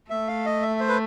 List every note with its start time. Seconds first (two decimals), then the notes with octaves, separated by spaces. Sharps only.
0.10 A3 E5
0.28 F5
0.46 D#5
0.62 E5
0.80 C5
0.89 B4